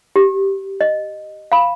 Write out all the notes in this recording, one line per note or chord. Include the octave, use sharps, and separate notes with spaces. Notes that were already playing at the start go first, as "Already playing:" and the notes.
G4
D#5
F5 B5